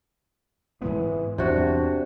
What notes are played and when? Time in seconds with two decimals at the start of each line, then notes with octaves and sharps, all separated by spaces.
0.82 G#2 E3 G#3 B3
1.38 E2 C3 D4 F#4